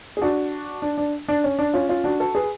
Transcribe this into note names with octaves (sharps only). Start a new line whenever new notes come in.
G#4
D4 F#4
D4
D4
D4
C#4
D4
C#4 F4
C#4 F4
D4 F#4
F#4 A4
G#4 B4